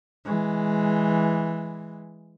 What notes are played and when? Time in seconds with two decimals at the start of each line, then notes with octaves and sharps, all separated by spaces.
0.25 E3 G#3